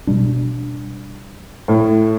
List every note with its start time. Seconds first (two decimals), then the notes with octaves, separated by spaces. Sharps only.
0.07 B2 G3 D4
1.68 A2